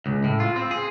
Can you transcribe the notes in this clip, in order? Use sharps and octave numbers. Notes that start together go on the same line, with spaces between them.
C#2
A2
F4
C4
G#4